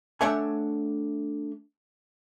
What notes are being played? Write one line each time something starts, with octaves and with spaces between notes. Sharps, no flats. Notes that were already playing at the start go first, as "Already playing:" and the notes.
A3 D4 C#5 E5 F#5 G#5